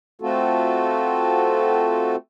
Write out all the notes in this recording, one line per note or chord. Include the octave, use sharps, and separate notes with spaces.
A3 C4 F4 F#4 A4